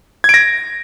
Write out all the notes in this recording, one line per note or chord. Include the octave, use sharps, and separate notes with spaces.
G#6 A#6 D7